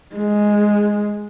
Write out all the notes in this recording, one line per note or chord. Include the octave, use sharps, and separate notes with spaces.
G#3